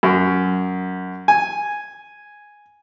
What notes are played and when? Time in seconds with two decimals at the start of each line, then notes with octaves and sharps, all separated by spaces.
0.03 F#2
1.28 G#5